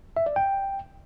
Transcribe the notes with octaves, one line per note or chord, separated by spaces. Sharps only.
E5
D5
G5